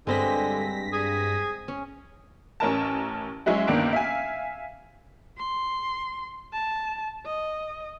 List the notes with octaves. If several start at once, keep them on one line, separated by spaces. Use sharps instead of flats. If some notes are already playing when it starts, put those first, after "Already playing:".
G2 D3 G#3 C4 A#6 B6
G#4
C#4
A1 C#4 A#4 A5
F#3 G#3 C#4 E4 F#4
G1 C#2 D#3 A#3 D4 D7
E5 F5 G#5
C6
A5
D#5